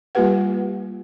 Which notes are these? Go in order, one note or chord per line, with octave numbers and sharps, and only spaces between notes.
G3 A#3 F4 G4 B4 F#5